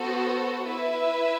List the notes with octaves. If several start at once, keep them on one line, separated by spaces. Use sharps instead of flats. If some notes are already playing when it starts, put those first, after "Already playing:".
Already playing: B3 F#4 A4 C5
E4 B4 E5